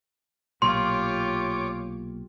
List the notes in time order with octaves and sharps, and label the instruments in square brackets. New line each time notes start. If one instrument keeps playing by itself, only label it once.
[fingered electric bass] B1 A#2 [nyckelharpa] F4 G4 [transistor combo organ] C#5 D6 [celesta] C6